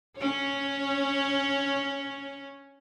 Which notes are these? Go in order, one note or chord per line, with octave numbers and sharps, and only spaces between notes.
C#4 C#5